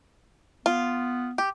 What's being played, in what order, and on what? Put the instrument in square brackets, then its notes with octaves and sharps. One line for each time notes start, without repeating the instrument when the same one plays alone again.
[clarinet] B3 [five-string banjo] F4
[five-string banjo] G4